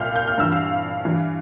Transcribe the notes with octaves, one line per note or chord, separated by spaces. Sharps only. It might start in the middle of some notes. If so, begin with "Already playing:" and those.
Already playing: C2 A#2 F5 F6 G6
G6
F6
G2 E3 E6
F5 F6
G2 E3